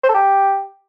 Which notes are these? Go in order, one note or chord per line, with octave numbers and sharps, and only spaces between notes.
C5
A4
G4